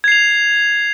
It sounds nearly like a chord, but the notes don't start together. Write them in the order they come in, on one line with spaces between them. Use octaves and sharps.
G#6 C7 F7